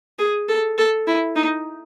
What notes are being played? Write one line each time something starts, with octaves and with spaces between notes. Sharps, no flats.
G#4
A4
A4
E4
D#4